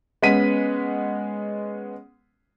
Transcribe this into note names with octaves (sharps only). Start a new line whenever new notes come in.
G#3 B3 C#4 F#5 B6 D#7